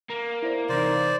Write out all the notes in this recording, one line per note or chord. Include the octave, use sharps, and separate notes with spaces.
A#3
E4 C5 D5
C3 E3 D#4 C5 D5